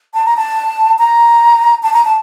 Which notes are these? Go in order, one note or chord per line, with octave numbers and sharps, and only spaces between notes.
A5
A#5
A5
A#5
A5
A#5
A5